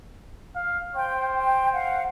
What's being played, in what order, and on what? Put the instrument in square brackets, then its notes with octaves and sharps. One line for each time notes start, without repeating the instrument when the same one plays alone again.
[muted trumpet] F5
[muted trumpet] C5 [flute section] G5
[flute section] G5
F5 F#5